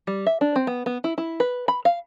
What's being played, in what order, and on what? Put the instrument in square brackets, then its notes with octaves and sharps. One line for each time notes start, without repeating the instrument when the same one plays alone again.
[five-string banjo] G3
E5
D4
C4
B3
B3
E4
E4
B4
B5
F5